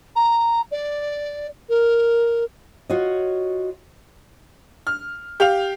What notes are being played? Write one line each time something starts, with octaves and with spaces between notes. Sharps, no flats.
A#5
D5
A#4
F4 F#4 C#5 D#5
F6
G4 F5 F7